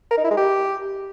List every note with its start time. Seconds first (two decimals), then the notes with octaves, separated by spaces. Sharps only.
0.11 A#4
0.18 D#4
0.24 E4
0.31 G#3
0.37 G4